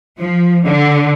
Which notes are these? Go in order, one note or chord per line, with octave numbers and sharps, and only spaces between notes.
F3
D3